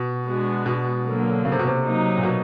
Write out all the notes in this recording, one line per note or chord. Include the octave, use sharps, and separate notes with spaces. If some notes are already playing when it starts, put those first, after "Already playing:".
Already playing: B2
G#3 B3 D4 F#4
B2
D3 F#3 A#3
C#3
C3
B2
C3
F#3 A#3 D#4
A#2
B2